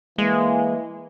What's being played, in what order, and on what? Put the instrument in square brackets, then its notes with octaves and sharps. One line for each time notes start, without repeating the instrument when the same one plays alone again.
[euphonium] E3 [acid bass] G#3 [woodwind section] A#3